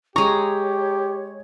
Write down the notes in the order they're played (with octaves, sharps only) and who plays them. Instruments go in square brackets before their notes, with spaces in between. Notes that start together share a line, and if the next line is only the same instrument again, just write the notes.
[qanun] G#3 A#5 [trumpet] G4 [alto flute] C#5 [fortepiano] C#6